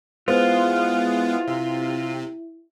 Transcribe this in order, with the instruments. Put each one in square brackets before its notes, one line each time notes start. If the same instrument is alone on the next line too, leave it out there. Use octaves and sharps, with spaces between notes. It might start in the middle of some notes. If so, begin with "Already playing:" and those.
[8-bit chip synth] G#3 B3 [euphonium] E4 [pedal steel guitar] F4 [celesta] B4 C5
[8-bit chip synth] C3